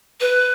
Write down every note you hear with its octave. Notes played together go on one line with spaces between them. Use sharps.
B4